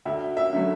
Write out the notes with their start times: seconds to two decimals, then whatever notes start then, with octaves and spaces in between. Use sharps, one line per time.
0.05 D2 E5
0.37 E5
0.53 D3 F#3 A3